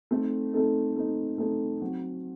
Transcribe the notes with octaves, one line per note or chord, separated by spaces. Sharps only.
A3 C4 D#4 A4
A3 C4 D#4 A4
A3 C4 D#4 A4
A3 C4 D#4 A4
F#3 C4 F#4